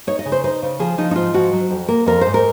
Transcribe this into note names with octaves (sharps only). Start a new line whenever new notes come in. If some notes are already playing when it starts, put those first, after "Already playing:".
D#4 C#5
D#5
C#3
C5
D#4 C5
C#3
F3 G#4
F3 D#4
D#4
G#2 F4
F3 F#4
F#3
F2
A#3 A#4
F2 A#4
G#2 C5
A#4